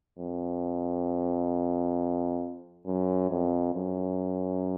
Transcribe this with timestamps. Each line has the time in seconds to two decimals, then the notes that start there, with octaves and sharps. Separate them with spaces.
0.18 F2
2.86 F#2
3.31 F2
3.74 F#2